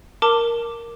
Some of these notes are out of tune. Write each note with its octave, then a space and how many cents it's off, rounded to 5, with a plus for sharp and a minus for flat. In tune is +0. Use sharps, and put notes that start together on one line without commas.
A#4 +0 A5 +30 D6 +0